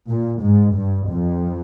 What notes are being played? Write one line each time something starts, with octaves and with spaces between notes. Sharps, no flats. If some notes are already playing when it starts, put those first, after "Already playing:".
A#2
G#2
G2
F2